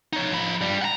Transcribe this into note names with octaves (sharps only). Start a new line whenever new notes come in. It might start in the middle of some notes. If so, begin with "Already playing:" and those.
D#4 C#5
F3 B5
G2 G3
F#5 A#5